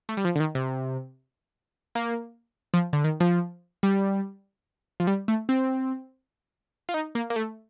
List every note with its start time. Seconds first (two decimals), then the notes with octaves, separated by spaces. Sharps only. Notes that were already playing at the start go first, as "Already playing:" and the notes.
0.09 A3
0.17 G3
0.25 F3
0.36 D3
0.40 D#3
0.55 C3
1.95 A#3
2.74 F3
2.93 D3
3.04 D#3
3.20 F3
3.83 G3
5.00 F3
5.07 G3
5.28 A3
5.49 C4
6.89 F4
6.94 D#4
7.15 A#3
7.30 A#3
7.36 A3